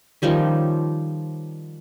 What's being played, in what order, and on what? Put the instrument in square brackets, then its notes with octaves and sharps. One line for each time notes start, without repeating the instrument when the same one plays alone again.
[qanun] D#3 F3 G3 C#4